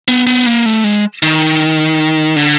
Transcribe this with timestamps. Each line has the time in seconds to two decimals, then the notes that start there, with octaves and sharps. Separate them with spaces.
0.08 B3
0.27 B3
0.46 A#3
0.66 A3
0.84 G#3
1.23 D#3
2.36 D3